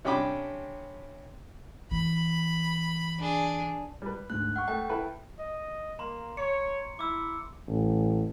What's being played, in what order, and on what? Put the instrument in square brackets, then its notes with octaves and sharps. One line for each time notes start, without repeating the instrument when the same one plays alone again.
[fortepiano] C3 C#4 D4 G5 B5 D6
[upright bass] E3 [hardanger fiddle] B5
[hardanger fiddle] D4 G#4
[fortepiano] G3 B4
[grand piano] D2 G#2 [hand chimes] F#6
[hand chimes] F#5 [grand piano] C#6 F6
[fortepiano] A3 [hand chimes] G5
[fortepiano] E4 A4 B4
[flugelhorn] D#5
[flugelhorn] A#3 [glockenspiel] A#5 C6
[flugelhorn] C#5 [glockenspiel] C#7
[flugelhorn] E4 [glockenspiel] D6 E6
[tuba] A1